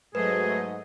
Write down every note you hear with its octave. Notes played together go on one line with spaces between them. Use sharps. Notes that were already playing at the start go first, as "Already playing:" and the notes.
G#2 F#3 A3 G#4 B4 D#5